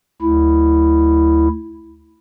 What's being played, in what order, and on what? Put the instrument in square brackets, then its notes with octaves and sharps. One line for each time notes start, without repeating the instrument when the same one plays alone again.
[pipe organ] D2 E4